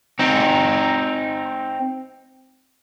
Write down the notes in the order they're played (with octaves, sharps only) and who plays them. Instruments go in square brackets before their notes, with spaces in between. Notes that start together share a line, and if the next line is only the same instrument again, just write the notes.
[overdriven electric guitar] C4 D#4